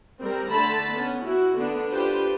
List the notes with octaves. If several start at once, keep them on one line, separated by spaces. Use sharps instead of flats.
G3 C4 A#4
D3 A3 A5 B5
B3 C#4
E4 F#4
D3 B3 D4
D4 F4 G4 B4 C5